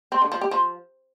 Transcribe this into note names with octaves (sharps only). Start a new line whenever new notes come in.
C4
D3
F3
G4
F3